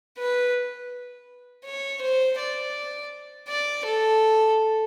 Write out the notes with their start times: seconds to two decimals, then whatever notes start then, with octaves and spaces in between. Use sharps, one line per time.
0.18 B4
1.65 C#5
2.01 C5
2.38 D5
3.48 D5
3.85 A4